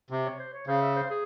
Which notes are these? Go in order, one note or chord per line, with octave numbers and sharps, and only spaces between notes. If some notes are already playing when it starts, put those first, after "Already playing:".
C3
C#5
C5
C#5
C#3 C5
E5
C5
G#4